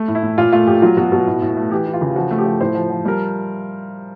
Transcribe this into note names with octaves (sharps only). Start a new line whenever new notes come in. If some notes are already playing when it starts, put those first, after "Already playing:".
Already playing: A3
A2
E4
A2
A#2 F4
A3 F4
A#2 G4
F#3 F4
B2 F#4
B2 F#4
A2
A2
A3
E3 G4
E3
F4
C#3
F3 F#4
A3
G4
F3
A2 C5
F3
F3
G3 A#4